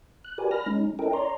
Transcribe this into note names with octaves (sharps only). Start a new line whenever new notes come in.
F#6
F#4 G4 A#4 B4 D5 G#5
B5 F6 A#6
G#3 C#4 D#4
C#4 E4 A4 A#4 D#5 G5
C#5 D5 A#5 C6